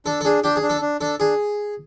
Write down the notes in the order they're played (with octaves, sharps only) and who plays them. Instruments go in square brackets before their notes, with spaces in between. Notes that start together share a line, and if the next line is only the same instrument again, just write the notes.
[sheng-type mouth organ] D4 [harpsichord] A4
[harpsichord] A4
[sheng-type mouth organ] D4 [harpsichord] G#4
[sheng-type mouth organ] D4 [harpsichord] G4
[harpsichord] G#4
[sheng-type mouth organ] D4
[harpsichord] A4
[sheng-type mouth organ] D4
[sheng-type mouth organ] D4 [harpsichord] A4
[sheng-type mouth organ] D4 [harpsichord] G#4